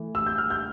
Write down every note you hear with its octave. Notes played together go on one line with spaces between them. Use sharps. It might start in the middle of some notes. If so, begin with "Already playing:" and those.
Already playing: E3 A3
E6
G6
F6
G6